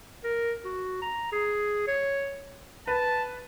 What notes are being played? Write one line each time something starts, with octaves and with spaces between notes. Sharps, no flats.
A#4
F#4
A#5
G#4
C#5
B4 A5